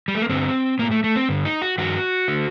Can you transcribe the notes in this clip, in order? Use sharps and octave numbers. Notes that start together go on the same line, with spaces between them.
G3
A3
A#3
G2 D3 C4
A2 A#3
A3
A3
C4
G2 D3
D#4
F#4
G2 D#3 F#4
D3